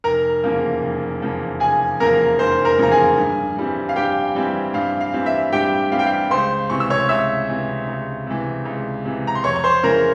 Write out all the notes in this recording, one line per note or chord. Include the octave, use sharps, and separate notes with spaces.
F1 A#4 A#5
E2 C#3 F3 A#3
F1
E2 C#3 F3 A#3
F1 G#4 G#5
E2 C#3 F3 A#3 A#4 A#5
F1 C5 C6
A#4 A#5
E2 C#3 F3 A#3 A#5
G#4 G#5
G2
E3 G3 C4
F5
G2 G4 G5
E3 G3 C4
G2 F5
F5
E3 G3 C4
E5
G2 G4 G5
E3 G3 C4 F5
G5
F5
C#2 C5 C6
C3 E3 C#6
E6
C#5 C#6
C#2 E5 E6
C3 E3
C#2
C3 E3
C#2
C3 E3
A#5
C6
F2 C#5 C#6
C#6
C5 C6
C#3 E3 A#4 A#5